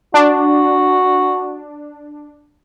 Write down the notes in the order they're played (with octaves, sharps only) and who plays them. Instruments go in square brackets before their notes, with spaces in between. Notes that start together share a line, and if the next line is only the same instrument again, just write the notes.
[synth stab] D4 [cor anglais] F#4